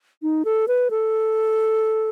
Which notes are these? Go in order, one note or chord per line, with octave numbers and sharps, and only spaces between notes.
D#4
A4
B4
A4